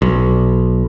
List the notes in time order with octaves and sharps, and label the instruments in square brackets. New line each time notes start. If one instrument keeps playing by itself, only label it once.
[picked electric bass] B1